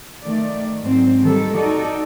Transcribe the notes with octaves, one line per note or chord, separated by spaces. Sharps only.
D#3 A3 D5
G#2 F#3 C4
D#3 G3 A#3 A4
D#4 F#4 A4 D5